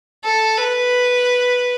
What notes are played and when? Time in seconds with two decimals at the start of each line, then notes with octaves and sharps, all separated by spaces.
0.24 A4
0.58 B4